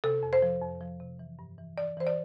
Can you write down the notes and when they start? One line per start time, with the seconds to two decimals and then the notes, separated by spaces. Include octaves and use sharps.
0.04 C3 A4
0.23 F2
0.33 C5
0.42 F3
0.61 F2
0.81 F3
1.00 C3
1.19 E3
1.39 G2
1.58 E3
1.78 E3 D5
1.97 E3 C5
2.07 D5